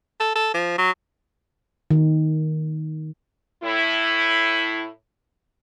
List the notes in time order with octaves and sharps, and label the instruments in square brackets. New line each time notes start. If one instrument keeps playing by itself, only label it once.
[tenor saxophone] A4
A4
F3
F#3
[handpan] D#3
[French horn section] A2 E4